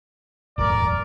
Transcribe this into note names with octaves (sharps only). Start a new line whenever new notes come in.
D#1 G#1 F2 A#4 D5